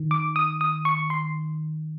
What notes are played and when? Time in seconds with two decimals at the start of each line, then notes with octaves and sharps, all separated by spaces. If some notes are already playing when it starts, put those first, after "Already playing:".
Already playing: D#3
0.11 D6
0.36 D#6
0.61 D#6
0.85 C#6
1.10 C6